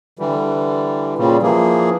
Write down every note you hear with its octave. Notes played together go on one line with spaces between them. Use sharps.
D3 E3 G3
A#2 C#3 G3
E3 F3 A#3 G#4